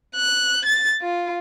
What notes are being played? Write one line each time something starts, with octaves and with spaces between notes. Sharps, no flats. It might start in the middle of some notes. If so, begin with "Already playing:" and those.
F#6
A6
F4